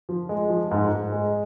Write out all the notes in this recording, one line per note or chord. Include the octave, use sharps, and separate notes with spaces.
F3
G#3
F3
G#2
G#2
G#3